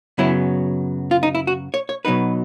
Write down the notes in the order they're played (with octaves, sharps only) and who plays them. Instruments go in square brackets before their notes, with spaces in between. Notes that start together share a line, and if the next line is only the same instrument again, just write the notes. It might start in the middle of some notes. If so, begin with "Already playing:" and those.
[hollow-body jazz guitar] F#2 C#3 F#3 B3 E4
F4
D#4
E4
F#4
C#5
C#5
B2 F#3 B3 D#4 B4